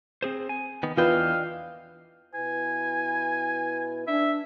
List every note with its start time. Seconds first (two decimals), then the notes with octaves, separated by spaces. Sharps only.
0.22 C4 G#4 C5
0.49 G#5
0.83 D#3 B3
0.97 E2 E3 D4 F4 B4 D#5 F5 G5
2.34 B2 E4 B4 G#5
4.07 D4 E5